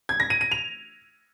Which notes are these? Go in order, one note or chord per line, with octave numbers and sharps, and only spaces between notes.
G#6
A#6
D#7
D#7
F7